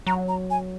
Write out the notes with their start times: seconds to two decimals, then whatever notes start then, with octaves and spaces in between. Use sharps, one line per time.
0.07 F#3 A#5
0.28 A#5
0.50 G#5